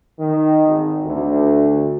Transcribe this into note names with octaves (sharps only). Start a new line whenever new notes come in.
D#3
G#1
D2